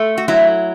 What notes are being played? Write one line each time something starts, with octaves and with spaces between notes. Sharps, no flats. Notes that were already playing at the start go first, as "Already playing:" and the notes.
Already playing: A3
F#4
F#3 E4